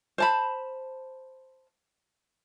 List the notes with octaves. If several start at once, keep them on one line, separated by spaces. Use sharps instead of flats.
C5 A5 B5